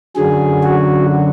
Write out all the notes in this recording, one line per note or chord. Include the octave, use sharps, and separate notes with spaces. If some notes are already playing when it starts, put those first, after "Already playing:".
F#2 D3 F#3 G#4
F#4